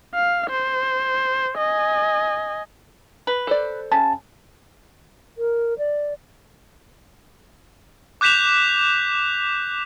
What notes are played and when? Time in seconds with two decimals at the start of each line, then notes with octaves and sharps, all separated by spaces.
0.14 F5
0.50 C5
1.58 D#5 G#5
3.27 B4
3.47 A4 C5 D5
3.92 C#3 A5
5.37 A#4
5.78 D5
8.21 D6 F#6 G6 B6 E7 F7